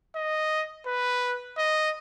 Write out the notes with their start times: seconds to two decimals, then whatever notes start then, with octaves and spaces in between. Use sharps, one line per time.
0.15 D#5
0.87 B4
1.58 D#5